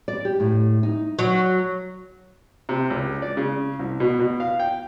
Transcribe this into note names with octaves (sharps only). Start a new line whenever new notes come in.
D5
G4
A2
D#4
F#3
C3
C#2
D5
C#3
C2
B2
B2
F5
G5